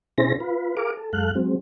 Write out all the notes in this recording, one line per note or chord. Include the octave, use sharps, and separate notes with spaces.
B2 C#4 E4 G#4 C5 A#6
F4 B4
G#4 A#4 F5 D6
A4
F#2 G#3 A4 F5 F#6
F#3 G#3 C4